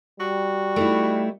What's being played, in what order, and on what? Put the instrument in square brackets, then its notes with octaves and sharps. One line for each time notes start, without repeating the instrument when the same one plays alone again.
[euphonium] G3 [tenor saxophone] F#4
[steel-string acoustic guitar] A3 D#4 E4